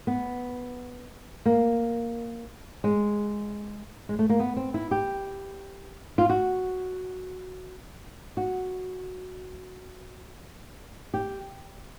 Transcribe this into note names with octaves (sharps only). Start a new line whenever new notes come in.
B3
A#3
G#3
G#3
A3
A#3
B3
C4
E4
G4
F4
F#4
F#4
G4